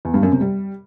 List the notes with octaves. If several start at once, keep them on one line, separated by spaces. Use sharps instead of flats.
E2
G2
F#2
C3
G3